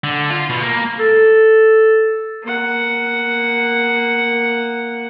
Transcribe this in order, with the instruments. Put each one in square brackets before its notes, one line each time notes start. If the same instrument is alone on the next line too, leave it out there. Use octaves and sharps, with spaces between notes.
[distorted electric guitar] D3
F4
B2
A#3
[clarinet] A4
[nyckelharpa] A#3 F#5